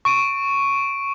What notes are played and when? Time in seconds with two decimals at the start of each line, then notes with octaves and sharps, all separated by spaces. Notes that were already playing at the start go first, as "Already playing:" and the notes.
0.05 C#6 D7 D#7